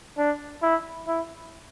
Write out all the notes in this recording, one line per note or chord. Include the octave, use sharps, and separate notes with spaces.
D4
E4
E4